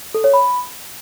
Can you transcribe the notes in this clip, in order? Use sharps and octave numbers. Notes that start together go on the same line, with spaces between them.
A4
C#5
B5